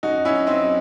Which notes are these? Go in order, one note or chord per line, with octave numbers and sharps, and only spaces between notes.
F#2 D#4 F#4
C#4 E4
F#2
C4 D#4
F#3